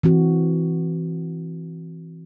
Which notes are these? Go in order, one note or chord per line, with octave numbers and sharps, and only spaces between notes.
E3 C4 F#4